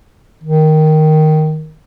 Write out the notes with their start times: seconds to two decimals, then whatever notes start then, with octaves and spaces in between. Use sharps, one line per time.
0.44 D#3